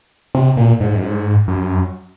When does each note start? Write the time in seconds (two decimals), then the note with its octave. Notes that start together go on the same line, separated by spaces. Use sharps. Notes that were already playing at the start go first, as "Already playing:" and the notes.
0.35 C3
0.57 A#2
0.80 G#2
0.95 F#2
1.03 G#2
1.48 F#2